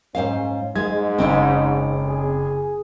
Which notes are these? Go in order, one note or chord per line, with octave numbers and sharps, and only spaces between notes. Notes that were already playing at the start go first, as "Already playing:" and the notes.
G#2 C#4 C5 F5
G#2 G#3 G#6
F#1 C4 C#4 D#4
G#4